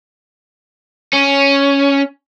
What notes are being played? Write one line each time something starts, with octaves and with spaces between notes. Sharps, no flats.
C#4